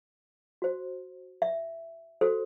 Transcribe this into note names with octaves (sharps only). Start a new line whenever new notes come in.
F#4 C5
E5
F#4 A4 C5